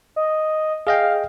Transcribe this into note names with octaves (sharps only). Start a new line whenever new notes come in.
D#5
G#4 D#5 F5 G5